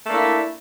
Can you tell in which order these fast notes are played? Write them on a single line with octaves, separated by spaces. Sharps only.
A3 A#3 D4 E4